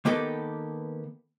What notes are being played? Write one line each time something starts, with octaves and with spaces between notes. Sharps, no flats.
D#3 A#3 B3 G4 A4 B4